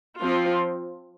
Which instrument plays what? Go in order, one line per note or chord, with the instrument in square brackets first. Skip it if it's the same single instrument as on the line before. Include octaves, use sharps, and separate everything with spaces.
[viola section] F3 C4 F4